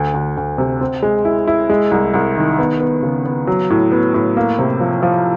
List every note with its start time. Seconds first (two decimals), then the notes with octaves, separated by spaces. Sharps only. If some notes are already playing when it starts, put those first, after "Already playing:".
Already playing: D2
0.14 D2
0.37 D2
0.58 C3
0.81 C4
1.03 G#3
1.25 E4
1.47 E4
1.70 G#3
1.91 C2
2.14 C2
2.37 D#3
2.58 B3
2.80 B3
3.03 C#3
3.26 B3
3.47 F#3
3.70 A2
3.92 B3
4.14 A2
4.37 A#3
4.59 C3
4.80 F3
5.03 F3